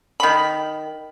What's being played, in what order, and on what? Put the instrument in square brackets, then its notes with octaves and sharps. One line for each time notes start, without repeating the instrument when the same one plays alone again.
[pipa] D#3 B5